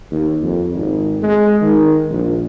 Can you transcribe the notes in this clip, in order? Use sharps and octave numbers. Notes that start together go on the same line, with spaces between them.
D#2
F2
G#1
G#3
D#3
A#1